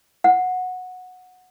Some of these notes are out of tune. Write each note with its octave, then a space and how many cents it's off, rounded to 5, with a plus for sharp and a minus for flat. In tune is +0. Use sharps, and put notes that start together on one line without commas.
F#5 -15